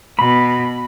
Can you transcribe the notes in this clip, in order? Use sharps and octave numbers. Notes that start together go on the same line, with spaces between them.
B2 B5